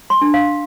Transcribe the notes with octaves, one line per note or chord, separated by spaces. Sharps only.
C6
D4
F5